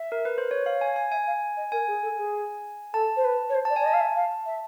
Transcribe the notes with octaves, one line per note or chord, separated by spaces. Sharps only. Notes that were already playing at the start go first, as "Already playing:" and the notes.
Already playing: E5
A#4
B4
C5
C#5
F5
G#5
G#5
E5 G#5
F5
D#5
A#4 G#5
G#4
A4
G#4
A4 A5
C5
B4
C#5
C5
D5 A5
D5 G#5
D#5 A5
F5
E5
F5
E5